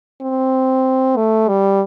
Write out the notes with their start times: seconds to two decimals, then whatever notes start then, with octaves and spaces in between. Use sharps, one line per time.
0.21 C4
1.17 A3
1.49 G3